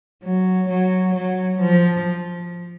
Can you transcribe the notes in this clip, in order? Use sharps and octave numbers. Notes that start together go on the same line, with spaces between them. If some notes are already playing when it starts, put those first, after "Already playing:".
F#3
F#3
F#3
F3